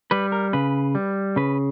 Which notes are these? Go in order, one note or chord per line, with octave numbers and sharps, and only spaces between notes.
G3 B4
A#4
C#3 B4
G3
C#3 B4